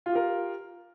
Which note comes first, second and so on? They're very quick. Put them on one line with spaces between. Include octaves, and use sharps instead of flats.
F4 F5 G4 A#4